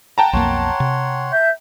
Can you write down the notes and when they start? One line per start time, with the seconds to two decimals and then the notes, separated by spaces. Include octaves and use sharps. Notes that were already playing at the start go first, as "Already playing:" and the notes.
0.18 F#5 G5 A5 A#5
0.33 B1 F2 A#3 C#5 F#5 C6
0.80 C3
1.30 E5 G6